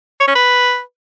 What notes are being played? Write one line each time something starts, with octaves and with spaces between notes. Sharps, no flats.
C#5
C#4
B4